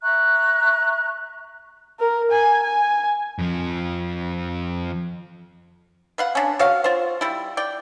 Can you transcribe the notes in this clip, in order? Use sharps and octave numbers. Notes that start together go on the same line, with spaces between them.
E5 A#5 C#6 F#6
A#4
G#5
G#5
F2 F3
B4 F5 F#5
C#4 D4
F#4 C#5 F5
F4 C5
G3 E4
D5 G5